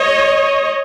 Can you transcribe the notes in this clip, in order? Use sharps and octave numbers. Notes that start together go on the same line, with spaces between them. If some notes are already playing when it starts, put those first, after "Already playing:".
Already playing: C#5 D#5